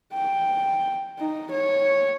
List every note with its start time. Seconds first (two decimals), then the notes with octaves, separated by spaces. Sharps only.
0.14 G5
1.19 D#4
1.51 C#5